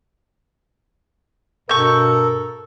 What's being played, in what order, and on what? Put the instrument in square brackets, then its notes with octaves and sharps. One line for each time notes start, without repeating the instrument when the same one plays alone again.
[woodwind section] G2 B2 [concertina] A4 [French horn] A#4 [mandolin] C#6 G6